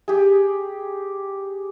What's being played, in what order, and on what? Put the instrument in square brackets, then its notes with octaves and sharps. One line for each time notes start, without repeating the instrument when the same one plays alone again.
[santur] G4 G#4